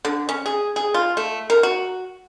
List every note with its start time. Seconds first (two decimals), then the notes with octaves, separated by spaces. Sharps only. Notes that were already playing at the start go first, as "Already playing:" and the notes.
0.05 D3
0.29 C#4
0.46 G#4
0.76 G#4
0.94 F4
1.17 A3
1.50 A#4
1.63 F#4